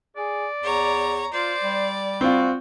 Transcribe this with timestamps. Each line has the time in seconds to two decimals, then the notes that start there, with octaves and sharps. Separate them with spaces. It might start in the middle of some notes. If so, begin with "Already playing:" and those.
0.17 G#4 D5
0.64 E2 C#5 A#5
1.33 F4 C5 D5
1.63 G3
2.21 C4 F4 F#4